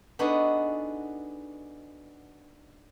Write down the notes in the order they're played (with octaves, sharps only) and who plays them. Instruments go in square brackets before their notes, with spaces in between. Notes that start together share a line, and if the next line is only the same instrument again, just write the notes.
[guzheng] B3 D4 D#4 F#4 G#4 A4